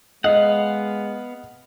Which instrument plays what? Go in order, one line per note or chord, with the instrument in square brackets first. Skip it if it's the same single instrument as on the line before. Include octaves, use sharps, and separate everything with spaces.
[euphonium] G#3 [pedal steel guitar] B3 F5 F#5 [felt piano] D#5